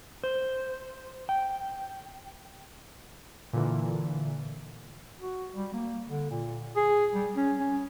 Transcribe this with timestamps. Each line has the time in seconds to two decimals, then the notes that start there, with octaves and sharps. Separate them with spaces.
0.24 C5
1.29 G5
3.53 A#2 D3 E3
5.21 F#4
5.55 G3
5.73 A#3
6.06 D3
6.31 A#2
6.76 G#4
7.14 G3
7.36 C#4
7.59 C#4